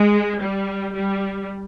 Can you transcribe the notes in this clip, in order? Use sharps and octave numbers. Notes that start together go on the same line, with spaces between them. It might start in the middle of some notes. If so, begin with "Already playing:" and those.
Already playing: G#3
G3
G3